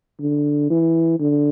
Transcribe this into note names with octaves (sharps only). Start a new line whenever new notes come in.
D3
E3
D3